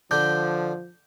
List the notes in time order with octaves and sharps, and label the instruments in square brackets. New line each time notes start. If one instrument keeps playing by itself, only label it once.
[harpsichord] D3 D4 [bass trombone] F3 [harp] G6